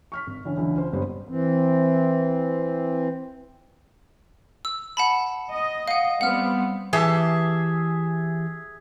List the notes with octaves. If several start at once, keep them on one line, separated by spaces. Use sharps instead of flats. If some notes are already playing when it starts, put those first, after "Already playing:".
C#6 F6 B6
G#1
D3 E3 C#4
C#2 D3 E3 F#3
C#2 C5
G1 B2 F#3 G3 B3 C5
E3 C4
E6
F#5 A5 B5
D#5
F5 F#5
G3 B3 C4 F#5 F6
E3 G4 G#4 E5 A5